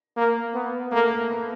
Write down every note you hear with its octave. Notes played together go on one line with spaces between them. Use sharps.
A#3
B3
A3 A#3
A#3
B3